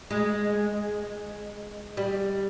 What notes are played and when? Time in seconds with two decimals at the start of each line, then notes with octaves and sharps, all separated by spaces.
0.11 G#3
1.97 G3